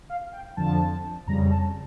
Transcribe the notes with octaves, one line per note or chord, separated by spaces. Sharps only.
F5
G5
F2 D3 F3 A5
F2 C#3 G3 A#5
A5